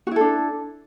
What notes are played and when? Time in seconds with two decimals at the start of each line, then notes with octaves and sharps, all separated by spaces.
0.07 F#4
0.11 E4
0.16 A4
0.21 D4